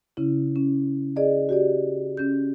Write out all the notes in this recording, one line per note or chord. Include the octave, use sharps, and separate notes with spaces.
C#3 C#4 E4
C#4
G#4 D5 D#5
F#4 G4 D5
C#4 G6